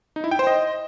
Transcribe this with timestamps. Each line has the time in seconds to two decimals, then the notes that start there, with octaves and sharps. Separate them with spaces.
0.16 D#4
0.24 E4
0.31 G5
0.39 C5
0.47 D#5